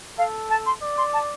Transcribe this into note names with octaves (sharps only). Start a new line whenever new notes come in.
A4 F5
A5
C6
D5
C6
A5